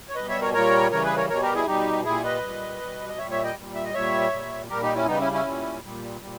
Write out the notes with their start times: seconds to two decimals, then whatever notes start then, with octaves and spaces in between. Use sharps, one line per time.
0.09 C#5
0.15 B2 G3 B4 D#5
0.29 C#5 E5
0.41 A#4 C#5
0.54 A#2 G3 A#4 C#5
0.91 C#3 E3 G3 A#4 C#5
1.04 G#4 B4
1.17 A#4 C#5
1.29 B2 G3 A#4 C#5
1.42 G4 A#4
1.55 E4 G#4
1.67 B2 G3 D#4 G4
2.05 A#2 G3 E4 G#4
2.24 B4 D#5
2.43 A#2 G3
2.81 B2 G3
3.09 D#5
3.18 A#2 G3 C#5 E5
3.31 C#5 E5
3.44 D#5 G5
3.56 A#2 G3
3.75 E5
3.85 D#5
3.94 A#2 G3 C#5 E5
4.32 A#2 G3
4.70 A#2 G3 G4 A#4
4.82 D#4 G4
4.95 C#4 E4
5.07 C#3 G3 B3 D#4
5.20 C#4 E4
5.32 C#4 E4
5.45 A#2 G3
5.83 A#2 G3
6.21 A#2 G3